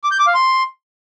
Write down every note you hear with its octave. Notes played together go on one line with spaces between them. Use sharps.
D6
G6
D6
F5
C6